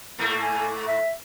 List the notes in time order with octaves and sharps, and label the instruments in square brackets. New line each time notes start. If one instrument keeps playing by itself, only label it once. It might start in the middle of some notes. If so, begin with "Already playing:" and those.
[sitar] G#2 A3 A#3
[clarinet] G#5
E5